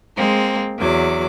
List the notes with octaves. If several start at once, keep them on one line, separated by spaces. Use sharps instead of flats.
G#3 A#3 C4
E2 F#3 D6